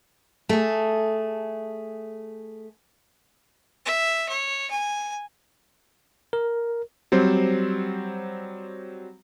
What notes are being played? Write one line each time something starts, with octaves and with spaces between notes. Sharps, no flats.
A3 G#4
E5
C#5
G#5
A#4
F#3 G3 C4 C5